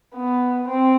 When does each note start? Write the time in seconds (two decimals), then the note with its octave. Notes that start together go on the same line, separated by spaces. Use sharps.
0.14 B3
0.68 C4